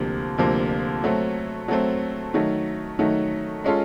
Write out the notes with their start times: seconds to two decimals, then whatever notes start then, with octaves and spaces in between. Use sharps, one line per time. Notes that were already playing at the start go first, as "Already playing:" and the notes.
Already playing: D2 C3 F3 A#3
0.38 D2 C3 F3 A#3
1.04 F#3 A3 C4
1.68 F#3 A3 C4
2.34 D#3 F#3 A3
2.99 D#3 F#3 A3
3.64 G#3 C#4 F4 A4